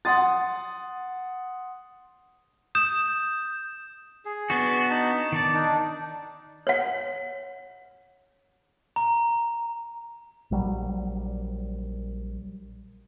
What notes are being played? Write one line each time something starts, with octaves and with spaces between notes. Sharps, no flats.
F#5 C6 D#6 A6
D#6 G6 E7
G#4
B3 D4 F#4
D#4 A5
D#3 D5
D4 D#4
C#5 F#5
A#5
A#1 F#3 G3